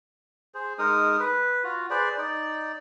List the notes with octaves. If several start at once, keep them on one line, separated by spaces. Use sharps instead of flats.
G#4 C5
G#3 D#4 A#4 D#6
B4
F4 F#4
G#4 B4 C5 D5
D#4 D5